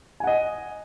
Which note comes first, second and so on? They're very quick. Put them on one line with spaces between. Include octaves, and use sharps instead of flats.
G#5 F#5 D#5